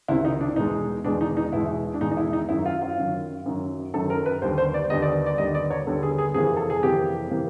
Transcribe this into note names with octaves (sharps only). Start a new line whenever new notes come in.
C#2 C3 D#3 E4
D#4
D4
E2 B2 G#3 D#4
E2 B2 G#3 D4
D#4
D#4
E2 B2 G#3 E4
D4
E2 B2 G#3 D#4
D#4
E4
D#4
F#2 D#3 F#3 E4
F4
F4
F#2 D#3 F#3
F#2 D#3 F#3
F#2 D#3 F#3 A4
A#4
B4
D#2 D3 G3 B3 C5
C5
D5
D#2 D3 G3 B3 D#5
D5
D5
D#2 D3 G3 B3 D#5
D5
C#5
D#2 D3 G3 B3 A4
G#4
G#4
F2 C3 E3 G3 A#3 G#4
A4
G#4
F2 C3 E3 G3 A#3 G4
C3 E3 G3 A#3